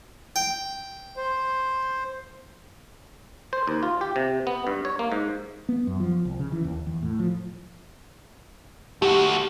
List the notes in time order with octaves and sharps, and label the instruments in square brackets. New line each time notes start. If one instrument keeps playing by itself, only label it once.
[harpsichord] G5
[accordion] C5
[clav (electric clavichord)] C5
D#2
F4
G4
C3
B3
G2
C#5
A#3
G#2
[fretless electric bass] B3
F#2
F3
C2
C#3
E3
D#2
E2
A2
F3
[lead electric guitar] A3 F#4 [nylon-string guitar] G4